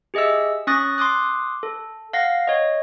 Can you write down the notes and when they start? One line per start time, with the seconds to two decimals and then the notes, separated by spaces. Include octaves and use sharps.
0.14 G4 G#4 D#5 E5 E6
0.67 C#4 C#6 D#6 F#6 A6 A#6
0.98 C6 D6 D#6 F#6
1.63 A4
2.13 F5 F#5 A#6 C7
2.47 C#5 D#5